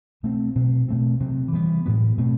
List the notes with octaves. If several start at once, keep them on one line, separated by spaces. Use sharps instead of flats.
B2 A3 C4
B2 F#3 C4
B2 A3 C4
C3 F#3 C4
E3 G3 B3
A2 F#3 B3
B2 A3 C4